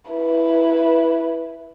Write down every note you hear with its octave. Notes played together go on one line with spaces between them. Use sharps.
E4 B4